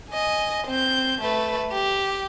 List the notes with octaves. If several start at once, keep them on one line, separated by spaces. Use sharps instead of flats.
D#5 G#5
C4 G6
A3 B4
G4